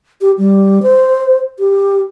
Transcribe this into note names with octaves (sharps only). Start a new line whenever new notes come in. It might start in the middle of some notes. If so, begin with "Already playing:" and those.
G4
G3
C5
G4